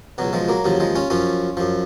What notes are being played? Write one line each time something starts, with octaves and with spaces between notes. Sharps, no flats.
C#2 B2 F#3
F3 G#3
F#3 A#3
D#2 C#3 F3 F#3
F3 G#3
C#4 F4
F#2 F3 C#4 F4
F#2 F3